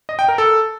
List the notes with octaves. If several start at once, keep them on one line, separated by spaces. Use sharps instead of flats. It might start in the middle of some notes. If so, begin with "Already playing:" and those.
D#5
G5
A#4
A4